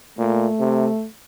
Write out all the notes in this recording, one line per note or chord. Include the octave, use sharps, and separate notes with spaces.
A#2 A3
C3